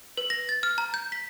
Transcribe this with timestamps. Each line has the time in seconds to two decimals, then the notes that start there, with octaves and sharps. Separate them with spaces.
0.17 B4
0.30 A#6
0.49 A6
0.63 F6
0.78 A#5
0.94 G6
1.12 B6